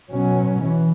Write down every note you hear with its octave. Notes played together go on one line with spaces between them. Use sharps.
B2 F#3 C#4
E3